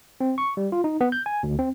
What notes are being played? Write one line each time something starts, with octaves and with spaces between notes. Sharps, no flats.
C4
C#6
G3
F4
D#4
B3
G6
G#5
D2
C4